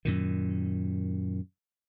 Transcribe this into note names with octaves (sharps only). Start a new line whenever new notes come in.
F#2 A#2 D#3